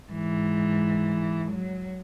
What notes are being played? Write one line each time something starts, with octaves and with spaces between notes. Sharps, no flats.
G#2 E3
F#3